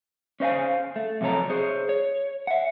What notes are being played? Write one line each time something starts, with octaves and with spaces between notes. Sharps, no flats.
C#4 C5 D#5 F5 G#5
A3
F2 C3 F#3 A4 C#5 A#5
G#4 C5 C#5
C#5
E5 F#5